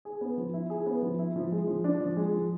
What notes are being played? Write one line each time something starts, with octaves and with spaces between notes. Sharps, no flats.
G#4
B3
F3
E4
G#4
B3
F3
E4
F3
G#3
F3
D4
F3
G#3
F3